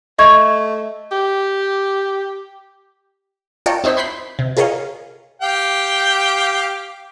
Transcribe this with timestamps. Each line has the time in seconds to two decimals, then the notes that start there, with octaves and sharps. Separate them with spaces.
0.19 A3 D#5 C#6 G#6
1.11 G4
3.66 F4 A#4 C#5 D5 G5 A5
3.84 C4 D#4 E4 C5 B6
3.97 B5 C6 F#6 G6 B6 C7
4.39 C3
4.57 F4 G#4 A#4 C#5 D#5 F5
5.42 G4 F5 G5